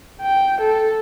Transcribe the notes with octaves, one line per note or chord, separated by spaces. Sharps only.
G5
A4